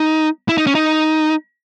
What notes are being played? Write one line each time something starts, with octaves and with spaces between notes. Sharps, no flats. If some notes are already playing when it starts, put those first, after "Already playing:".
Already playing: D#4
E4
D#4
C#4
D#4